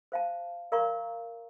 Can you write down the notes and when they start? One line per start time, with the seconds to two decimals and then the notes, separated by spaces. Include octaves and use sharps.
0.12 C5 F5 A5
0.72 A#4 D5 F5 A#5 C#6